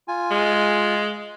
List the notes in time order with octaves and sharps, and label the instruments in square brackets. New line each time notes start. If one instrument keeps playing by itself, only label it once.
[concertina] F4 G#5
[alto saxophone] G#3